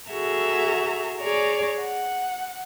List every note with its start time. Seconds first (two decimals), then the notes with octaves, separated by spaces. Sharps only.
0.10 F#4 G#4 A4 E5 A#5
1.19 G#4 C#5 D5 A#5
1.80 F#5